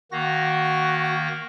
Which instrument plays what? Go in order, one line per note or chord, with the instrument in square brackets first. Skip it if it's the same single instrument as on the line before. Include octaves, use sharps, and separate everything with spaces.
[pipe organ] D#3 A#3 A#6 [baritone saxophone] F#4